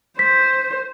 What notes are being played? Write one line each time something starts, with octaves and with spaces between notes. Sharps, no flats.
C5 B6